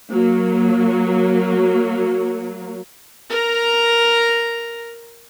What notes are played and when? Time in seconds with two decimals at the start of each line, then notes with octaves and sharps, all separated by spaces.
0.12 F#3 A#3
3.30 A#4 A#5